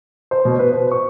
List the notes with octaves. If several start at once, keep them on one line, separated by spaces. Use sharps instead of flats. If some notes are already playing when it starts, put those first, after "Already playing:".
C5
B2
B4
C5
C#6